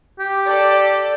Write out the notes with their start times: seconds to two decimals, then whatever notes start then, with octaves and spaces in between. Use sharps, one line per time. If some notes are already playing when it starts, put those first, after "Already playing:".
0.19 G4
0.48 A4 D5